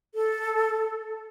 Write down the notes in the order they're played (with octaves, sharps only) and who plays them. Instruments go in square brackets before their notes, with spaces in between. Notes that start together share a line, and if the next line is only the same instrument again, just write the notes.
[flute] A4